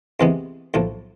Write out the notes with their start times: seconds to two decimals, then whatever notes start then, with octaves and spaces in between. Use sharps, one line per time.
0.20 C2 C3 E3 G#3 B3
0.74 B1 A2 F3